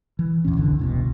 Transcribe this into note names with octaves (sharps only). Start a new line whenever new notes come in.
E3
E2 A#2 C#4
F1 C2 D3 E3
E1 C2 B2